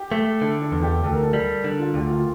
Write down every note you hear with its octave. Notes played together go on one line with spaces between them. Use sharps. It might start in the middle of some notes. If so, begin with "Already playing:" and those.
Already playing: G4
A3
D3 A4
A4
E2
G4
D2 A4
A#4
A4
G3
D3
F4
D2 G4
F4